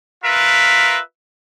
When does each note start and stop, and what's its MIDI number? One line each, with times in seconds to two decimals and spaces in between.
0.24 0.98 65
0.24 0.98 70
0.24 0.98 71
0.24 0.98 76